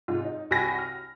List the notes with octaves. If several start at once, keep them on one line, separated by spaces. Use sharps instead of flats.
G#2 C3 F4
D#4
C2 F#4 G5 G#5 B5 A#6
F6